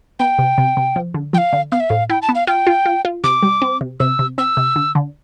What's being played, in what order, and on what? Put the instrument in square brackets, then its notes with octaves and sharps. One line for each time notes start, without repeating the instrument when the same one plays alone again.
[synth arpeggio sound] B3 [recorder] G5
[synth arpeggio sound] C3
C3
C3
F3
D3
[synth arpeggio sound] F3 [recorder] G5
[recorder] F5
[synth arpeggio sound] D3
[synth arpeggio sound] B3 [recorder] F5
[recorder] E5
[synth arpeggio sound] A2 [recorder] F5
[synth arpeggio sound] E4 [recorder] G5
[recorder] A5
[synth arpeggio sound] B3
[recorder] F5
[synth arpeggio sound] F4 [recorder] G5
[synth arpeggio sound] F4
F4
F4
[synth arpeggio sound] C3 [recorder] D6
[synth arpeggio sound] G3
C4
C3
[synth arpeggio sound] C3 [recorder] E6
[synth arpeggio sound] C3
[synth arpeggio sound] C4 [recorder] E6
[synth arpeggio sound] C3
D3
D3